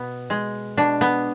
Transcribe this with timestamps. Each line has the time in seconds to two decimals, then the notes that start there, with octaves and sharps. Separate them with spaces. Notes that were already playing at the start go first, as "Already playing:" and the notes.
Already playing: B2 B3
0.30 G#3
0.77 B2 D4
1.01 B3